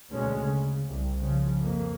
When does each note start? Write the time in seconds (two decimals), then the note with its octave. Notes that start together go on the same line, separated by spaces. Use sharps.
0.11 D2 B2 G#3 C#4
0.43 C#3
0.88 C2
1.20 C#3 F3
1.60 F2 A#3